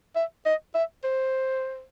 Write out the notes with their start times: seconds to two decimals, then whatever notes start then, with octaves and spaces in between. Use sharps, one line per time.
0.16 E5
0.46 D#5
0.75 E5
1.04 C5